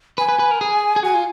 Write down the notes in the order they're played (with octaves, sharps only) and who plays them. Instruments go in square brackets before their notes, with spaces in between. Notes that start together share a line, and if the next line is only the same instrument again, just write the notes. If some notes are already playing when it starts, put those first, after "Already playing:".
[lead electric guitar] B4 [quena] G#5
[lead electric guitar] B4
B4
A#4
G#4
G#4
[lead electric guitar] F#4 [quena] G#5
[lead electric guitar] F4